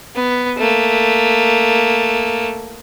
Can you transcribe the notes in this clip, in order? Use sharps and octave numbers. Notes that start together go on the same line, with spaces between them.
B3
A3 A#3